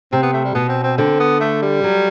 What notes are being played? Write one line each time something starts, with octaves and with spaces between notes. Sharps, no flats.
C3 C4
B3
A3
G3
B2 B3
C4
C4
D3 C4
B3
A3
G3
F#3